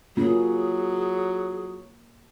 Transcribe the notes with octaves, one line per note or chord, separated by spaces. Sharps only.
F#3 A#3 C#4 F4 G#4